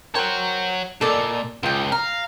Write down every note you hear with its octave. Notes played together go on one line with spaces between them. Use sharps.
A#4 C5 C#5 F#5 G5
A#2 A4 D5 D#5
C#2 F4 G5
F5 A#5